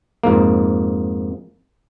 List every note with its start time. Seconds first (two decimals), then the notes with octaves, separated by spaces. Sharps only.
0.24 F2 G#2 A#3